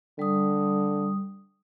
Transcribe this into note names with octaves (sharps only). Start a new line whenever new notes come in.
D3 G3 D#6